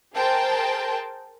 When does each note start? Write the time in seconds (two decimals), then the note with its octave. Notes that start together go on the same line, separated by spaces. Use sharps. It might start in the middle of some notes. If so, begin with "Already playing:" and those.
0.15 G#4 A#4 C5 G5 A5